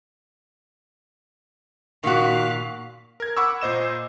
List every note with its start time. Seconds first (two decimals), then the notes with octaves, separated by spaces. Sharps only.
2.04 A#2 D#3 F#4 F5 F#6
3.20 A#4 G#6
3.37 F#5 B5 C#6 D6 E6
3.61 A#2 C5 D#5 E7